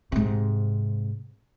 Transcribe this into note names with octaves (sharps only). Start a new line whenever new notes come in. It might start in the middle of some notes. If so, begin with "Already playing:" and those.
G#2 C3